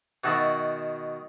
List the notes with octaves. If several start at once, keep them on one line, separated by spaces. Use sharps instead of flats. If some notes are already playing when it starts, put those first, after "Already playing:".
B2 D#3 F#4 E5 A5 B5